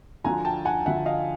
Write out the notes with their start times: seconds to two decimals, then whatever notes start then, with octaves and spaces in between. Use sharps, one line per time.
0.24 D2 D3 F3 G#5 A#5
0.45 G5 A5
0.65 F#5 G#5
0.86 D2 D3 F3 E5 F#5
1.06 D#5 F5